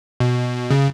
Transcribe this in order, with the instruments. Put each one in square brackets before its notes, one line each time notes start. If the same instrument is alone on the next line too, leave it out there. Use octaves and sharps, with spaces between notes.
[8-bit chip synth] B2
C#3